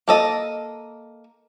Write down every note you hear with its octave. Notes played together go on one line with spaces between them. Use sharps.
A#3 A4 D#5